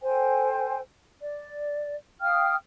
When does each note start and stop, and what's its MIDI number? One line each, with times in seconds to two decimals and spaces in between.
0.02 0.79 69
0.02 0.79 72
0.02 0.79 79
0.02 0.79 80
1.22 1.95 74
2.21 2.55 77
2.21 2.55 79
2.21 2.55 87
2.21 2.55 89